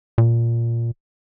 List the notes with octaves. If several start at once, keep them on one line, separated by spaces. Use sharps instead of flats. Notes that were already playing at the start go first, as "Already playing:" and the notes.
A#2